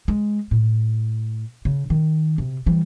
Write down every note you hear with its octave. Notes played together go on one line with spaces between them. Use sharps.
G#3
A2
C#3
D#3
C3
E3 G3